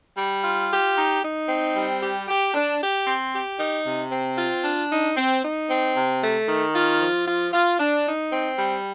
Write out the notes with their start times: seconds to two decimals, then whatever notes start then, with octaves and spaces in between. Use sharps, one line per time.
0.18 G3
0.44 F4
0.70 G4
0.97 D#4
1.23 D#4
1.49 C4
1.76 G3
2.01 G4
2.28 G4
2.54 D4
2.80 G4
3.07 C4
3.33 G4
3.59 D#4
3.86 C3
4.12 C4
4.38 F4
4.64 D4
4.91 D#4
5.17 C4
5.43 D#4
5.70 C4
5.96 C3
6.22 A3
6.48 D#3
6.74 F4
7.00 F3
7.27 F4
7.53 F4
7.79 D4
8.06 D#4
8.32 C4
8.58 G3